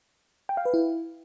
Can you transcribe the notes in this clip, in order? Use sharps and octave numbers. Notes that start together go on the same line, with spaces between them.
G5
F5
B4
E4